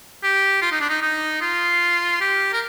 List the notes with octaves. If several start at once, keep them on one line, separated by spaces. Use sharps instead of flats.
G4
F4
D#4
D4
D#4
D#4
F4
G4
A#4